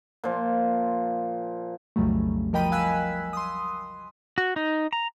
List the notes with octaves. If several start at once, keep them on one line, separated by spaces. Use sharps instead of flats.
A#2 F3
B1 F2 C#3 F#3 G3 A3
F3 A#4 D#5 G5 B5 D#7
F5 G#5 E6 F#6 B6
C6 D#6
F#4
D#4
A#5